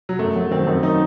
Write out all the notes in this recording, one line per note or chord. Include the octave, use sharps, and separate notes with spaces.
F#3
F#2 A3
F#3
D#3 C4
F#2
D#4